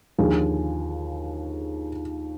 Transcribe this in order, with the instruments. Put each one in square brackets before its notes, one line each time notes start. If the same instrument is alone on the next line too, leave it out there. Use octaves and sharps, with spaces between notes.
[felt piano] D#2 D3 F3 G#4